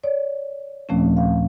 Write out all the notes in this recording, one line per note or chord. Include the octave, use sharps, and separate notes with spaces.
C#5 D5
D#2 A#2 F3 A3 C4 C#4
F5